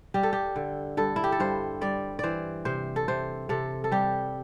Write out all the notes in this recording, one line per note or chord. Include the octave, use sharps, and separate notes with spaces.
G3 G4
A4
G4
D3
G2 A4
E4
G4
A4
G2 C5
G3 D5
E3 C5 D5
C3 C5
A4
C3 C5
C3 A4
A4
G3 G4